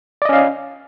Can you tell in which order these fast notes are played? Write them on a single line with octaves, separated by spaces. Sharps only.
D5 D#5 C#4 F5